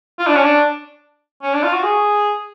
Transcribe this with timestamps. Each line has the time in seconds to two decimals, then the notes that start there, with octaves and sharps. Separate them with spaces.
0.19 F4
0.27 D4
0.35 C#4
0.43 D4
1.43 C#4
1.54 D4
1.63 F4
1.73 F#4
1.83 G#4